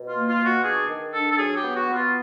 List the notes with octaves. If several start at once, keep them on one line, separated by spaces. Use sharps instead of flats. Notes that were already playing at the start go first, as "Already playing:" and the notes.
Already playing: B2
F4
A#3
F4
B2
F#4
D4 G#4
D#3
D4 A4
A4
F#3 G#4
G4
B3
F#4
B3
F4